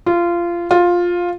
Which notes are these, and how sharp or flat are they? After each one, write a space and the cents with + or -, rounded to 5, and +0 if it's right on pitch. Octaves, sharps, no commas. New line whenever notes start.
F4 -20
F4 +10